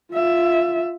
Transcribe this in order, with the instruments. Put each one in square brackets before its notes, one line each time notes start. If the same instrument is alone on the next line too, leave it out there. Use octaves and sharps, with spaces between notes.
[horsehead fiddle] F4 E5